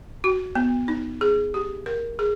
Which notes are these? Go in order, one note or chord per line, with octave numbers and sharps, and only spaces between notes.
F#4
B3
D#4
G#4
G4
A#4
G#4